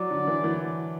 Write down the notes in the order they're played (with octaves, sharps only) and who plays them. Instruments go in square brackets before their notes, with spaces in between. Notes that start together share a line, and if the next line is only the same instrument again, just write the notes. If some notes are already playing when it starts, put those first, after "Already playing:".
Already playing: [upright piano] F#3 [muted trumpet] D5
[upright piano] D3
E3
E3